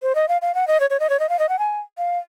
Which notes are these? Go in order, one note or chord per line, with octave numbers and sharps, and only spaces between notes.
C5
D#5
F5
F5
F#5
D#5
C#5
C#5
D#5
C#5
D#5
F5
D#5
F#5
G#5
F5